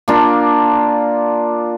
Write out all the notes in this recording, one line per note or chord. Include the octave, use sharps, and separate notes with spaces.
A#3 D4 F4